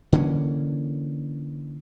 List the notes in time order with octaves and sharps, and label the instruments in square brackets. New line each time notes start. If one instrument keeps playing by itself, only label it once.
[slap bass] D3 E3 A#3 C#4